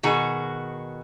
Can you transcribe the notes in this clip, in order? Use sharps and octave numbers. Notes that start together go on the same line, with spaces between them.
B2 D#3 F#4 G#4